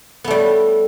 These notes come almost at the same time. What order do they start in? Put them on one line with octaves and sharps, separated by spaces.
B3 A3 G3